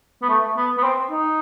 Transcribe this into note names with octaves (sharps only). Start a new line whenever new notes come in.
B3
A3
B3
B3
C4
D#4